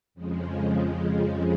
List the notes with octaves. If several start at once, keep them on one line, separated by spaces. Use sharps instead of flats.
F2 C#3 F3 G#3